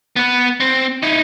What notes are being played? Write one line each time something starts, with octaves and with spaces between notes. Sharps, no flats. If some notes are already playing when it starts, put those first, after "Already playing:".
B3 B4
C4
D#4 E4